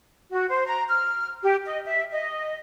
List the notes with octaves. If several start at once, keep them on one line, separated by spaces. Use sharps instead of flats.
F#4
C5
A#5
F6
G4
D#5
E5
D#5